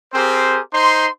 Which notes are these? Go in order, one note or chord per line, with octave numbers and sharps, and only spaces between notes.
C4 G4 G#4 A#4 C5
D#4 C5 C6